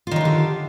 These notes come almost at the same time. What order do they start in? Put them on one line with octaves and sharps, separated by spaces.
F4 D#3 F#3 D3 G4